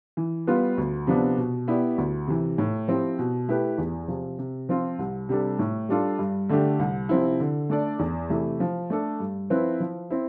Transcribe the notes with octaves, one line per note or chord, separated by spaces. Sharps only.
E3
G3 B3 F4 B4
D2
C3 F3 B3 D4
B2
B3 E4 G4 D5
D2
C3 E3
A2
F3 C4 E4 G4
B2
A3 E4 G4 B4
E2
C3 F3
C3
F3 C4 F4
C2
C3 G3 D4 A4
A2
G3 D4 F4 A4
G2
D3 A3 D4 G4
C2
C3 F3 C4 E4
D3
A3 D4 A4 D5
E2
C3 E3 A3 E4
F3
A3 D4 A4
G2
F3 C4 E4 B4
F3
C4 E4